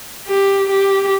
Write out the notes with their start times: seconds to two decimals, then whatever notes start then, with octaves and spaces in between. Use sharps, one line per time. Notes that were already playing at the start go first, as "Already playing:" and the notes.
0.27 G4
0.69 G4